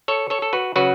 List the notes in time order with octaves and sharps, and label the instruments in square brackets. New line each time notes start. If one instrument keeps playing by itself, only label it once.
[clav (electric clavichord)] A4 C#5
A4 C#5
A4
F#4 B4
C#3 F#3 F#4 B4